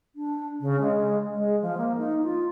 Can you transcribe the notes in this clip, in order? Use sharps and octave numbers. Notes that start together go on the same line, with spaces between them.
D4
C#3
G#3
G#3
F3
A#3
D#4
F4